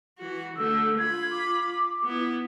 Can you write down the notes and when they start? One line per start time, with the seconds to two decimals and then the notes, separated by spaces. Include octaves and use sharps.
0.18 E3 F#4
0.57 D3 A3 E6
0.98 F4 B5 G#6
1.32 D6
2.04 B3 E4